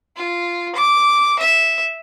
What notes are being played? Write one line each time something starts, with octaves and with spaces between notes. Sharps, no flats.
F4
D6
E5